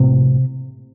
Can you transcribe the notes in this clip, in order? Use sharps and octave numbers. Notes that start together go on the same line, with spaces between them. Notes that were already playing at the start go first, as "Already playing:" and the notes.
Already playing: A#1 A2 C3 C4